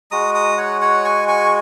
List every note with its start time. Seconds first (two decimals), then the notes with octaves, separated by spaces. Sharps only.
0.11 G#3 F#4 A#5 D#6
0.35 A#5 D#6
0.58 C#5 F#5
0.81 C#5 F#5
1.05 G#5 C#6
1.28 G#5 C#6